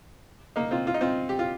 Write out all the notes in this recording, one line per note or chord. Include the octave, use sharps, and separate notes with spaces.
A#3 D#4
C4 F4
F4
D#4
C4 F4
G4
F4